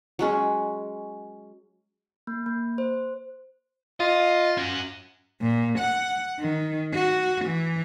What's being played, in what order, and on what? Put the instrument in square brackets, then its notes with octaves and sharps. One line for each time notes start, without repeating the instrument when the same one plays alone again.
[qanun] F#3 G#3 C#4
[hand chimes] A#3
A#3
C5
[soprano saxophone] F4 [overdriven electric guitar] D#5
[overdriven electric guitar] C#4 F#4
[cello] A#2
F#5
D#3
F#4
E3